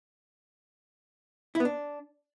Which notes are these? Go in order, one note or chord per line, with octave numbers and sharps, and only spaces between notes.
E4
B3
D4